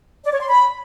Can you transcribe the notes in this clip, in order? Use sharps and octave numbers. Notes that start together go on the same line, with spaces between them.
D5
C#5
C6
B5